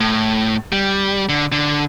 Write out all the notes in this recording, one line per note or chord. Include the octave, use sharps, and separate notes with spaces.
A2
G3
D3
D3